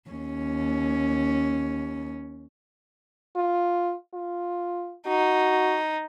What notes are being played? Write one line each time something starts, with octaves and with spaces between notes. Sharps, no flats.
D#2 C#4
F4
F4
D#4 F#4